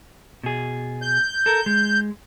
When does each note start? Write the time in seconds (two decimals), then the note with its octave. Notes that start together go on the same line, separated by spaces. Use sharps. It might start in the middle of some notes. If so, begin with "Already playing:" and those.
0.43 B2 G#4
1.02 G6
1.46 A4 A#4
1.66 G#3